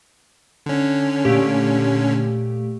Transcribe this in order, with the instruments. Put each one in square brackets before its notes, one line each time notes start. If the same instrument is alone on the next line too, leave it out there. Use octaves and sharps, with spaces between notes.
[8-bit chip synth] D3 C#4
[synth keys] A#2 A3 G4